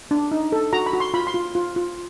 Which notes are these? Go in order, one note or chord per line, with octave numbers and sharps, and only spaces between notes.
D4
D#4
A4
F#4 A#5
B5
F#4
C6
F4 B5
C6
F4
F4
F4